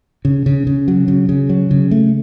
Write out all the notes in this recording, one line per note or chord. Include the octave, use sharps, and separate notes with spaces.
C#3
C#3
C#3
F#3
C#3
C#3
F#3
C#3
A3